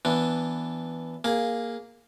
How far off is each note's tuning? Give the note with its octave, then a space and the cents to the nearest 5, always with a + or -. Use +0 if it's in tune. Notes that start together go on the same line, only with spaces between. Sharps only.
E3 +0 B3 +0 D4 +0
A#3 +0 G#4 -5